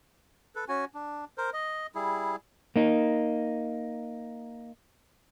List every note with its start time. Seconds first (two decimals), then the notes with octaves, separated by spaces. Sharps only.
0.55 A4 B4
0.68 C#4 F#4 G#5
0.95 D4
1.38 A#4 C5
1.53 D#5
1.95 G3 E4 G#4
2.76 A#3 D#4